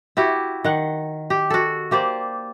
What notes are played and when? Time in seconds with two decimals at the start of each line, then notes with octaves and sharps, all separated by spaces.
0.17 E4 F#4 G4
0.64 D#3 F#5
1.30 G4
1.50 F#4 A4
1.91 A#3 G4 C5 D5